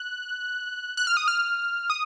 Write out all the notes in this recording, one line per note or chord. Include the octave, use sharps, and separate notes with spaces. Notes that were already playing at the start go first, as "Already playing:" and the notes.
Already playing: F#6
F#6
F6
D#6
F6
D#6